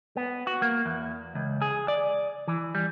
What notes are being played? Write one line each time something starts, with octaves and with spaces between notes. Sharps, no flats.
B3
F#4
A#3
E2
C#2
G#4
D5
E3
G3